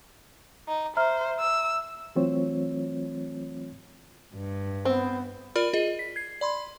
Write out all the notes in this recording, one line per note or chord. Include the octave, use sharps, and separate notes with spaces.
D#4
C5 E5 A#5 F6
E6
E3 F#3 A3 C4 F4 C#5
G2
B3 C4
F4 A#4 D5 B5 F6
F4 G#4 D#5
B6
G#6 C7
D5 B5 C6